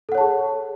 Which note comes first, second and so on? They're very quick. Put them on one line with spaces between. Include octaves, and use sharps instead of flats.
A4 F#5 C#5 A5 G#4